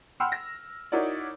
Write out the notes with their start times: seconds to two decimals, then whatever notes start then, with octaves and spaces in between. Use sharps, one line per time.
0.20 F#5 G5 B5 C6 E6 F6
0.32 A#6
0.92 D#4 E4 F#4 A#4 C#5 D5